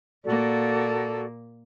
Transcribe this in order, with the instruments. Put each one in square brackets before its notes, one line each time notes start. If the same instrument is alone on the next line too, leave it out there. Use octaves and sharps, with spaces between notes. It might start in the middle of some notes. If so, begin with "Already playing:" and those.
[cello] A#2 A#3 [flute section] F#4 A4 D5